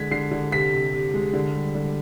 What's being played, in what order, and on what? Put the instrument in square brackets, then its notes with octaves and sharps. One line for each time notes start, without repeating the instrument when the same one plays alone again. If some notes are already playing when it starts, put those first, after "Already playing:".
Already playing: [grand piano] D3 G#3 G#6 B6
D3 C7
D3
C3 B6
C3
C3
G#3
D3
G3
D3